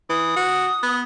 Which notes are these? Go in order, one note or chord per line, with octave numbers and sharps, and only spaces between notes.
E3 D#6
F#4
B3